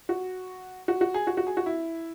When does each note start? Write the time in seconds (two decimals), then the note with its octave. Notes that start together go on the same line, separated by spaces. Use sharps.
0.09 F#4
0.88 F#4
1.01 F#4
1.14 G#4
1.27 F#4
1.37 F#4
1.47 G#4
1.57 F#4
1.66 E4